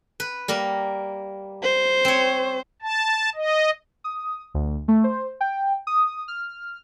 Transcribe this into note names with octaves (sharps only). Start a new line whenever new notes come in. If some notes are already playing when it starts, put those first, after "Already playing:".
B4
G3 A#3 A#4
C5
C4 C#5
A5
D#5
D#6
D2
A3
C5
G5
D#6
F6